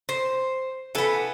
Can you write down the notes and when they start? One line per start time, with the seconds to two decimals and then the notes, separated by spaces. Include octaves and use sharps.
0.09 C5
0.95 E3 B3 A4